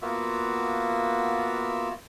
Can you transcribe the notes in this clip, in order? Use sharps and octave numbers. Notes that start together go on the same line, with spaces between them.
A#3 B3 F4 F#4 E5